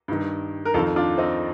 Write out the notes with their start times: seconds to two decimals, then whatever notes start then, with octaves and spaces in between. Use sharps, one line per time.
0.08 G2 D#3
0.65 A#4
0.74 F2 F4 A4
0.78 D#3
0.96 D4 F4
1.18 C4 D#4